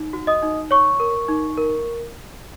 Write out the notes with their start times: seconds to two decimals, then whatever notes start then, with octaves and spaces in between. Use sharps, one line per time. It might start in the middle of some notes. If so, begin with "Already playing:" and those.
Already playing: D#4
0.13 F#4
0.27 D#5 D#6
0.43 D#4
0.71 C#5 C#6
1.00 A#4
1.28 D#4
1.57 A#4